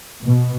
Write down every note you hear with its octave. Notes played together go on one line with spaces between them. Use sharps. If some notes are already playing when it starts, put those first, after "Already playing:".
B2